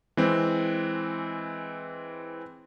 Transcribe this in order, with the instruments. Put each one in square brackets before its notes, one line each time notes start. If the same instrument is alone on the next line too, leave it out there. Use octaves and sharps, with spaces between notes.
[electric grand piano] E3 G#3 C4